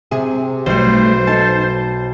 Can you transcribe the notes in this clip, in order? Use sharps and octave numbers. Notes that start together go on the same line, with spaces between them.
C3 G#4
B1 G3 A3 C5
D#4 A4 A5